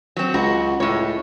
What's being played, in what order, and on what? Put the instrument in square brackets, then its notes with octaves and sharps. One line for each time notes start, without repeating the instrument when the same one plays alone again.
[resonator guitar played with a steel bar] F#3 C4
[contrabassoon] C#2 [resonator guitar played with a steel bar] F#4
[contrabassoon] C#2 [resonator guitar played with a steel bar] A2 C#5